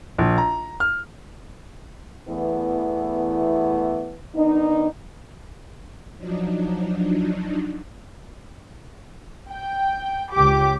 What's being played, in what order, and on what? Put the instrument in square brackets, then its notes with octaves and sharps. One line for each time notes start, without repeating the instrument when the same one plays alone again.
[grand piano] A#1
A#5
F6
[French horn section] E2 E3 A3 B3 E4
D#3 B3 D4 D#4
[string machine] F3 F#3 D4 D#4
[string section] G5
C#2 G4 D6